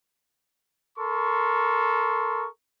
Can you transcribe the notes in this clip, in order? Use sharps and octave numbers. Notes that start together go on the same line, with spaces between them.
A4 A#4 C6 C#6